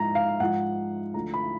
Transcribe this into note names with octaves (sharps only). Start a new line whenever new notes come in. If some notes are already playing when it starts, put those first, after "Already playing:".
Already playing: G#2 F3 A#5
F5
G#2 F3 F#5
D2 D3 F3 A#5
B5